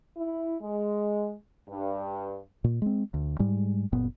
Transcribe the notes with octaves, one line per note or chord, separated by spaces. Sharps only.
E4
G#3
G2
A#2
G#3 C4
D2
G#2 G3 G#3
F#1 A#2 B3